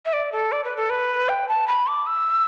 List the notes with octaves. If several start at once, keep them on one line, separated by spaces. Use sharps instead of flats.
E5
D5
A4
D5
B4
A4
B4
G5
A5
B5
D6
E6